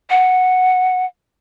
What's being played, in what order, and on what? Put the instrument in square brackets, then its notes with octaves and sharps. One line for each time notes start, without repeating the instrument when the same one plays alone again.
[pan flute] F#5